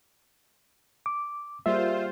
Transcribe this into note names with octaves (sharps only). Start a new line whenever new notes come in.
D6
G3 A#3 F4 G#4 C5 E5